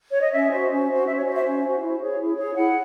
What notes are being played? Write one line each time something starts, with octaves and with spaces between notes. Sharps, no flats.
C#5
D#5
C#4 E5
F#4 C5
C#4
F#4 C5
C#4 E5
C#5
F#4 C5 D#5
E5
C#4
F#4 C5
E4
G#4 C#5
E4
G#4 C#5
E4 F#5